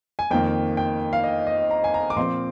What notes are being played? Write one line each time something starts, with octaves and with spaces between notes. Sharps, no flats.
G#5
F2 D#3 A#3 G5
G5
F5
D#5
D#5
A#5
G#5
A#5
D6
A#2 F3 C4 C6